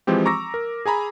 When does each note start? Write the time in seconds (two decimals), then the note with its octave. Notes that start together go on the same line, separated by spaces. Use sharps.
0.07 E3 F3 G#3 C4 G4
0.26 A#5 C#6 D6 E6 A#6
0.54 A#4
0.86 G#4 G#5 A#5 B5